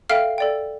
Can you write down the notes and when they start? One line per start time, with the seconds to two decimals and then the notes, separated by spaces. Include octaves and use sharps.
0.10 A4 E5 F5 G5 F6
0.38 A4 D5 G5